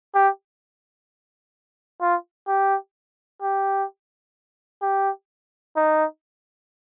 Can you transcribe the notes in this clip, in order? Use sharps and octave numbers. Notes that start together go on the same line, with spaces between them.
G4
F4
G4
G4
G4
D#4